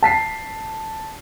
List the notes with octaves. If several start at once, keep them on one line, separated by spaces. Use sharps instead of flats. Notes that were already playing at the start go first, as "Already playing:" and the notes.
A5 B6 C7